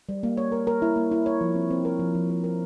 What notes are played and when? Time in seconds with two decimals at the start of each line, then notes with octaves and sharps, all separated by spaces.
0.09 G3
0.23 A#3
0.37 C#5
0.52 A#4
0.67 A#4
0.82 E4
0.96 A#3
1.12 E4
1.26 C#5
1.41 F3
1.55 C4
1.70 C4
1.85 A#4
2.00 F3
2.15 F3
2.30 A#4
2.44 A#4